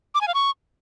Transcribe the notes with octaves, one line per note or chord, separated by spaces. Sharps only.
D6
G#5
F5
C#6